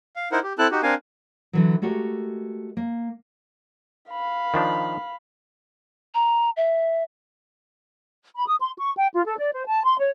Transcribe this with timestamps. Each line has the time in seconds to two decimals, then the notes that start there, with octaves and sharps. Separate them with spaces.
0.16 F5
0.32 D#4 E4 A#4 C5 F#5
0.43 G4
0.59 C4 E4 A4 A5 F#6
0.72 D#4 F#4 G4
0.83 C4 D4 A#4 F5 G#5
1.53 D3 E3 F#3
1.82 G#3 A3 F#4 G4 A#4
2.77 A#3
4.10 F5 B5
4.54 D#3 F3 D4
6.15 A#5
6.57 E5
8.36 B5
8.47 D#6
8.60 C6
8.78 C#6
8.95 G5
9.13 F4
9.25 A4
9.39 D5
9.53 C5
9.67 A5
9.84 C6
9.99 C#5